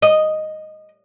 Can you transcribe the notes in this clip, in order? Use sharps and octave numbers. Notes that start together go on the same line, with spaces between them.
D#5